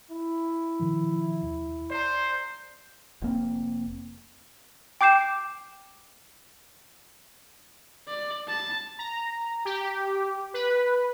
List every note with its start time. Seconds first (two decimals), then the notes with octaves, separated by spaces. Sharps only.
0.11 E4
0.80 B2 D#3 F3
1.43 D#2
1.90 C5 D5 A#5
3.22 F1 A#3 C4
5.01 G5 D6 G6 C7 E7
8.08 D5
8.48 A5
8.99 A#5
9.65 G4
10.54 B4